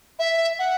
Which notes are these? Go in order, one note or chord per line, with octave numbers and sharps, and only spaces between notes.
E5
F#5